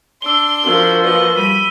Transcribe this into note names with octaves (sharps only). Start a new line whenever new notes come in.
D4 C6 E6 G7
F3 F#4 A#4 E6 F#7
A#3 B4 D#5
G3 B5 B6 D#7